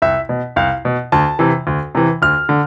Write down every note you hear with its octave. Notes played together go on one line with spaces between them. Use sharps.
C2 E5
B2
C2 F5
B2
D2 A5
C3 E3
D2
C3 E3
D2 F6
D3